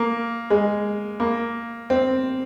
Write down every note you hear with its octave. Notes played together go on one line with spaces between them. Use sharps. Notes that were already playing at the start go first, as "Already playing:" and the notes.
Already playing: A#3
G#3
A#3
C4